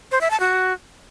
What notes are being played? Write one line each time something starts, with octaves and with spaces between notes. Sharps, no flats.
C5
E5
A5
F#4